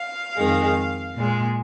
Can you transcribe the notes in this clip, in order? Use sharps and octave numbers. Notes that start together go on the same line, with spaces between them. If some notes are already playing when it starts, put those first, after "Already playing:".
Already playing: F5
F2 D#3 G#3
A#2 G#3